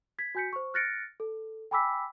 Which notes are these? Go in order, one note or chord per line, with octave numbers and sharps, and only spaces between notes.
G#6 B6
F#4 G#5 G6 B6 C#7
C5 C#6
F6 F#6 A6 A#6 C#7 D7
A4
G5 G#5 B5 D6 E6 B6